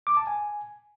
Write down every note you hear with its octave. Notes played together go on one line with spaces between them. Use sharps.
D6
A5
G#5